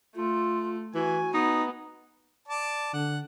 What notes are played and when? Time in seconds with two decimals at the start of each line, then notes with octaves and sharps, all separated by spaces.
0.15 A3 F4
0.95 E3 F#4 G#5
1.34 B3 D#4
2.48 D5 A5
2.94 D3 F#5